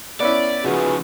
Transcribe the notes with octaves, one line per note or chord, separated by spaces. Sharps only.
B3 C#4 E4 D5
C#3 F3 F#4 G#4 B4